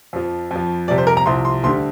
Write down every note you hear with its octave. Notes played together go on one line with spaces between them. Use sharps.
F2 F3
F2 F3
F2 C3 G3 D5
C5
A#4
A#5
C2 C3 F3 C6
C6
D2 D3 G3 C6